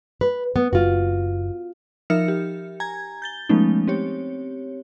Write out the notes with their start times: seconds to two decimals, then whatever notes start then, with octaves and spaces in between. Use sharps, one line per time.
0.21 B4
0.56 B3
0.73 F#1 F4 F#4
2.10 F3 D#4 A#4 E5 F6 C#7
2.28 G4
2.80 G#5 A#5 G#6
3.22 G6 A6 G7
3.49 F3 G#3 A3 B3 C#4 D#4
3.88 C4 G4 C#5